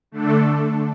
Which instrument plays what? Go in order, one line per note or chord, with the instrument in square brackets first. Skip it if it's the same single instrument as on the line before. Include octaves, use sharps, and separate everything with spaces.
[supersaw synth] D3 A3 D4 A4